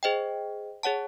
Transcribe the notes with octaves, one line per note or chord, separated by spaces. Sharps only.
G#4 C5 D#5 G5
G#4 C#5 F#5 A5